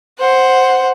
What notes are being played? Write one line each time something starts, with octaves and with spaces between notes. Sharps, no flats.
C5 F#5